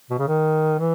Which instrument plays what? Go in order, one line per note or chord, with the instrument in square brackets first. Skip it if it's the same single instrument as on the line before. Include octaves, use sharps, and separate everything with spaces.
[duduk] B2
C#3
D#3
E3